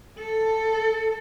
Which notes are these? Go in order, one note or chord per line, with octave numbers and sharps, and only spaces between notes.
A4